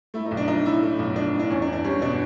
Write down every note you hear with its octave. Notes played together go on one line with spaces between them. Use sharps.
A3 E4
D#4
B1
D4
F3 D#4
A2 E4
A3
B1
F3 D4
A2
D4
E2 C#4
D4
E2
D4
G3 C#4
B2 D4